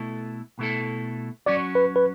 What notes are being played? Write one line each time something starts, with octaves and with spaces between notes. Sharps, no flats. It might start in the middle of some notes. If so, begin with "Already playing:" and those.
Already playing: B2 A3 E4 A4
B2 A3 E4 A4
F#3 C#4 F#4 C#5 D5
B4
B4